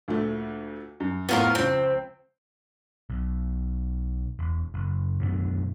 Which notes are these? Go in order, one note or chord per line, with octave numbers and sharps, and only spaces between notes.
D2 A#2 A3
F#2
F2 A2 B3 F4 A#4 C#6
C#2 F3 C4
B1
E1
F#1
F#2 B2 D3